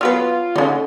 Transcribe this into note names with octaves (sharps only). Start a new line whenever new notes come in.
F#3 B3 F4 B4
D3 C#4 D#4